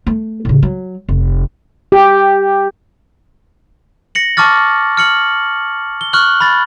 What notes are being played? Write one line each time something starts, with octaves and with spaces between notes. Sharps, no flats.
A3
A2 C#3
F#3
F1
G4
A#6 C#7 F#7
A5 C#6 D6 F6 A6
F6 C#7 F#7
G7
C#6 F6 F#6 F#7
B5 A6